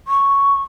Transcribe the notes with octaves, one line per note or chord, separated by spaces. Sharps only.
C#6